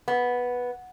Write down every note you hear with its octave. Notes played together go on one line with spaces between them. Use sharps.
B3